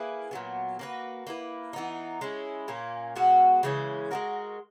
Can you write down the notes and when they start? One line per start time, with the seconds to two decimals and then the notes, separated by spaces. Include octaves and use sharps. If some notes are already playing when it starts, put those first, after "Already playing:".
Already playing: A#3 E4 G#4 B4
0.31 A#2 F#3 B3
0.79 A#3 C#4 F#4 B4
1.27 A#3 E4 B4
1.73 E3 B3 D#4
2.21 G#3 C#4 E4
2.68 A#2 A#3 C#4
3.16 B2 G#3 B3 F#4
3.63 C#3 E3 G#3 C#4
4.11 G#3 B3 F#4 A#4